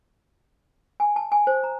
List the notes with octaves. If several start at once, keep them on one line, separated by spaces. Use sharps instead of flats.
G#5
A5
G#5
C5
A#5